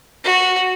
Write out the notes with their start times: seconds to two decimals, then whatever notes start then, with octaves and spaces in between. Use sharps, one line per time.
0.24 F#4